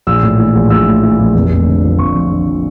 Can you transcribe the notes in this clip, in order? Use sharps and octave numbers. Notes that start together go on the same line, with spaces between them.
A#1 E6
A2
E3
A#1
A#1 E6
A2
E3
A#1
F1
F2
D3
F3
F1 C#6
F2
D3
F3